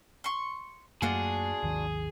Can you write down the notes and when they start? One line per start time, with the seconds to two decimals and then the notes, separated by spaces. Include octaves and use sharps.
0.24 C6 C#6
1.02 F#2 A3 A#3 D4 F4 F#4 G#4
1.63 G#1 D#2 D#3